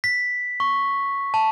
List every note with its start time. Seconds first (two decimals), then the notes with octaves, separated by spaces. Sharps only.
0.04 B6
0.60 C#6
1.34 A5